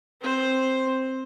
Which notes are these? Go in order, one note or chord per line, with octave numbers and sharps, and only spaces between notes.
C4 C5